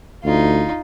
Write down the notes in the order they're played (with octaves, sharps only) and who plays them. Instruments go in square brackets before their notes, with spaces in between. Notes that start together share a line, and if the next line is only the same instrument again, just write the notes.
[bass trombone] D2 [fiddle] D#4 F4